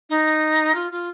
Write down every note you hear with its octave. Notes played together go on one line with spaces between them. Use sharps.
D#4
F4
F4